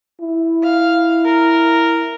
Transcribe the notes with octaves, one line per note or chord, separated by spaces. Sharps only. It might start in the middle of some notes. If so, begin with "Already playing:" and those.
E4
F5
A#4